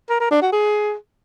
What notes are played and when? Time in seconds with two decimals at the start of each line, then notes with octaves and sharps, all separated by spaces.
0.10 A#4
0.20 A#4
0.31 D4
0.42 F#4
0.52 G#4